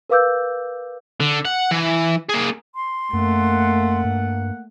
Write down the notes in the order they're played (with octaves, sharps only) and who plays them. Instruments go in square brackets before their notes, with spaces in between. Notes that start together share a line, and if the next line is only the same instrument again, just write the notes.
[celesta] A#4 B4 F5 D6 E6 G6
[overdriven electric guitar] D3
F#5
E3
A#3 G#4
[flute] C6
[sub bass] F#2 [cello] A3 [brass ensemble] A#3 F#5
[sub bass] G2